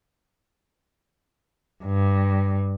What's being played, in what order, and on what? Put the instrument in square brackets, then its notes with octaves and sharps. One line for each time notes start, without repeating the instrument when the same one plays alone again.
[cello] G2